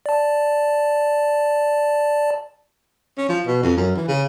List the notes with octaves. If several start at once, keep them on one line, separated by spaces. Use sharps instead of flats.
D5 A5
C#4
F3
B2
F2
F#2
E3
C#3